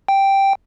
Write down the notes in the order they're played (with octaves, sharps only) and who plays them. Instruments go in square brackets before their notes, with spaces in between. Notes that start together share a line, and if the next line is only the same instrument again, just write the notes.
[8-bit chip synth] G5